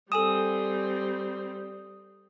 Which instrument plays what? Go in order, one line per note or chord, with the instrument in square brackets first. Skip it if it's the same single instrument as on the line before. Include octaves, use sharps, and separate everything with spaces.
[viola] G3 C4 [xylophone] A4 G#5 E7 [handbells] D#6